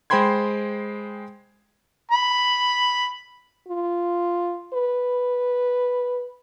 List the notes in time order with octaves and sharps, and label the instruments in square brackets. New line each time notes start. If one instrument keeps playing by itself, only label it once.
[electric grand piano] G#3 C5 G5 B5 C6 G#6
[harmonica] B5
[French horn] F4
B4